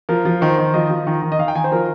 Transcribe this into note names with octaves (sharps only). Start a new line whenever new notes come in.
F3 A#4
F3
D#3 C5
D#3
F3 D#5
F3
D#3
D#3
D#5
D#3 F5
G5
D#3 G#5
C5
F3 A#4